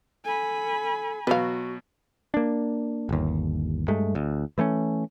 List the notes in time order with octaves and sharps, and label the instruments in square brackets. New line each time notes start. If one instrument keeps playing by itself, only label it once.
[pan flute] A4 [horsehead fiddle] G#5 B5
[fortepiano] B2 F#3 [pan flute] F#4 [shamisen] B4 F5
[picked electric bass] A#3 D4
G1 D#2
G2 G#3 A3
D2
E3 A3 A#3 C#4